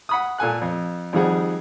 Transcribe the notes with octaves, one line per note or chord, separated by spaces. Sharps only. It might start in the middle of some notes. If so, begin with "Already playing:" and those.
F#5 B5 D#6
A#2 A4 G#5 F#6
F2
F2 D#3 F3 G3 G#4 F#5